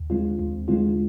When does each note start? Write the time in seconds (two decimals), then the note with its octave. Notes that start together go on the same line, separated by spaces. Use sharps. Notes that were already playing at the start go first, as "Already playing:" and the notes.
Already playing: D#2
0.10 D3 G#3 C4 F4
0.39 D#2
0.68 D3 G#3 C4 F4